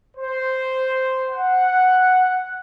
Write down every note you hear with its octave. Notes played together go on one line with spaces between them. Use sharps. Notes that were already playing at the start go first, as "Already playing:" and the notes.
C5
F#5